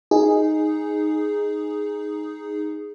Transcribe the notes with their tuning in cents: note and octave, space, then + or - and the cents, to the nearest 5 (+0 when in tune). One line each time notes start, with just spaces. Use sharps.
D#4 +0 G#4 +0